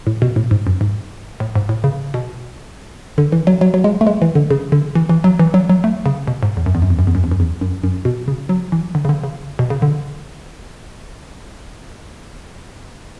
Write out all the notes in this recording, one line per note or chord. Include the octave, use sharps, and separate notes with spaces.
A2
B2
A2
G#2
F#2
G#2
A2
G#2
A2
C#3
B2
D3
E3
F#3
F#3
F#3
G#3
A3
G#3
E3
D3
C#3
D3
E3
E3
F#3
E3
F#3
F#3
A3
C#3
B2
G#2
E2
F#2
E2
F#2
E2
F#2
E2
F#2
E2
F#2
E2
F#2
F#2
B2
C#3
F#3
E3
D3
C#3
D3
C#3
B2
C#3
D3